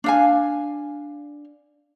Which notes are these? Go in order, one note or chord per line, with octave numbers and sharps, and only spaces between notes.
D4 F5 G#5